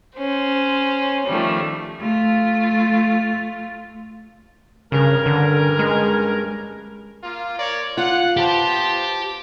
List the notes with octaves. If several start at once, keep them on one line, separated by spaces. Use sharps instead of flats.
C#4 C5
D#3 F3 G3 A3
A3 F4
G2 C#3 C#4 A#4
D3
G#3
A#3 F4
A#4 C#5 D5
F4 F#5
B3 G4 C5 A5